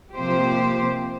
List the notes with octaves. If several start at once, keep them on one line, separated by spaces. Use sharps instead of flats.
C3 F3 A#3 G4 C5